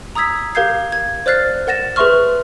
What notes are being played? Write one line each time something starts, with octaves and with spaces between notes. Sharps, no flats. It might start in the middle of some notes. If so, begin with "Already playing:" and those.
A#5 D#6 E6 G#6 B6
G4 A#4 F5 G6 G#6 C7
G#6
C5 D5 F6 F#6 A6 C7
A#4 F#5 A6 A#6 E7
G#4 B4 E5 C6 C#6 F6